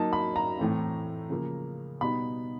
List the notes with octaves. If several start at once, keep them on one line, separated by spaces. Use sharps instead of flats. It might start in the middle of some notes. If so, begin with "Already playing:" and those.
Already playing: F#3 A#3 D#4 A5
B5
A#5
A2 E3 A3 C4
C#3 F3 A#3
B2 G3 B3 D#4 B5